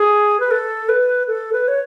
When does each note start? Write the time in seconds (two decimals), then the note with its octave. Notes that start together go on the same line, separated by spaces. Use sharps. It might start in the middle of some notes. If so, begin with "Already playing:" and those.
Already playing: G#4
0.40 B4
0.51 A4
0.89 B4
1.28 A4
1.53 B4
1.68 C#5